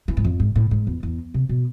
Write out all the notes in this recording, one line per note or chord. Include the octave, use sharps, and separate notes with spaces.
E3
G#2
F2
G#2
A2
G#2
E2
E2
C3
B2